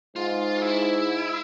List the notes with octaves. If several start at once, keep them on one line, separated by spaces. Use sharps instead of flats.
G#2 F4
E4